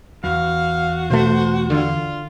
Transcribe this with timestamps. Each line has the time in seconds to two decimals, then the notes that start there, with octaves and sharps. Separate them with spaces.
0.24 E2 F#4 F5
1.10 B2 A3 C5
1.70 D3 F4